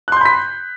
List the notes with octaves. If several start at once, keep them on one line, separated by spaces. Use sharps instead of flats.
B5 C6 F#6 G6 B6